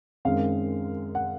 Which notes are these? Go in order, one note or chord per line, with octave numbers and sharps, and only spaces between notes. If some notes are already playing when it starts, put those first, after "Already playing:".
F#2 D#3 G#3 C4 F5
F#5